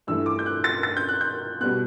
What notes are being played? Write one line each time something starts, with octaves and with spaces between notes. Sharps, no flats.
G2 E3 A3 E6
D6
G6
F#6
A6
A6
G6
F#6
G6
B2 G3 B3 F#6